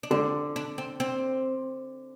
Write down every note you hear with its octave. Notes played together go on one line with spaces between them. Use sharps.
D4
D3 C4
D4
C4
C4